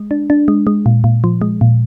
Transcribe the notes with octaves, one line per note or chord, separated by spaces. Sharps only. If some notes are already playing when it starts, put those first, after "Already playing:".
Already playing: G#3
D4
D4
G#3
G#3
A#2
A#2
F3
G#3
A#2